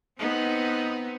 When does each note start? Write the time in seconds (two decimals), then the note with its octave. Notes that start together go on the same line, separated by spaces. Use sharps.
0.19 B3 C4 D#4